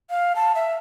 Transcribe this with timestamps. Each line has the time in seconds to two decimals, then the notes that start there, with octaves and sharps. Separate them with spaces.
0.10 F5
0.36 A5
0.55 E5